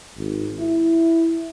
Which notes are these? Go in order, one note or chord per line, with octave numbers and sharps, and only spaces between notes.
G#1
E4